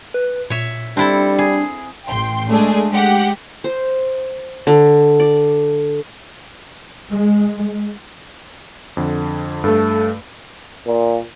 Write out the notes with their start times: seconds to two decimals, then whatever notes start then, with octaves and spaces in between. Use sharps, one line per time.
0.14 B4
0.50 A#2 C#5 E5
0.97 G3 C4 D4 E4 A4
1.39 G#4
2.08 A1 G5 C6
2.49 G#3 A3 D4 G#4
2.90 G#3 G4 F#5
3.64 C5
4.67 D3
5.20 D5
7.10 G#3
8.97 F2 D3
9.64 G2 A3 A4
10.86 A#2